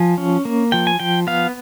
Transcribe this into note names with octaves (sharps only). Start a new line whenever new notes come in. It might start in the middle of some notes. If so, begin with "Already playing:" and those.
Already playing: F3 G#5
C#4
A#3
F3 G5
G#5
F3 G5
B3 F5